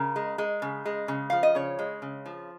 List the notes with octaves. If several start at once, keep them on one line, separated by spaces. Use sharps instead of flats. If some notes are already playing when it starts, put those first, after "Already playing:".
Already playing: C#3 A#4
G#3
G#3
C#3
G#3
C#3
F3 F5
D#5
C#3 C#5
G#3
C#3
F3